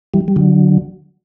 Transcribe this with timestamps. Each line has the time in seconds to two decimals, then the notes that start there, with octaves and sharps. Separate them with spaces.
0.14 E3 G3
0.28 G3
0.36 D3 F#3